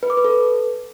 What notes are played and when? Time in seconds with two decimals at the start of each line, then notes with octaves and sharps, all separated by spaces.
0.03 B4
0.10 D6
0.17 B4
0.25 A4